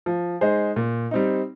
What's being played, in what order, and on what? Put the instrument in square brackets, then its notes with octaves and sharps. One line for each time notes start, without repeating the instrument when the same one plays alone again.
[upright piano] F3
G#3 D#4 G#4 C5
A#2
G3 C4 D#4